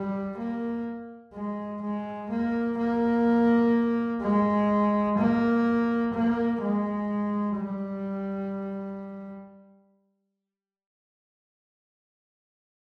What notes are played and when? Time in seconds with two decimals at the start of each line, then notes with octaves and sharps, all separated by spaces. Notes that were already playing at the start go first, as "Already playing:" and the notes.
Already playing: G3
0.38 A#3
1.33 G#3
1.82 G#3
2.30 A#3
2.78 A#3
4.22 G#3
5.18 A#3
6.14 A#3
6.62 G#3
7.58 G3